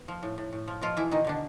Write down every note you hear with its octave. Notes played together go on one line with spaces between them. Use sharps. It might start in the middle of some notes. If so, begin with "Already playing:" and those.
Already playing: B3
F3
A2
A2
A2
F3
B2 F3 F4
E3 G#3 E4
B2 D#3 D#4
B2 D3 D4